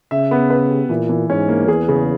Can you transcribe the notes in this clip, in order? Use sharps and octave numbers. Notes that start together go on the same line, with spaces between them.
C#3 E5
B3
B4
G4
A#2 E3
E3
G#2 C#4
A#3
E2 G#4
C#3